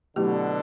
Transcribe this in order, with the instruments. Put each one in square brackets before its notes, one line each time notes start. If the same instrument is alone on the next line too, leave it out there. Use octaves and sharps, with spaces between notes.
[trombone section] B2 D3 [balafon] F#3 A3 E4 G4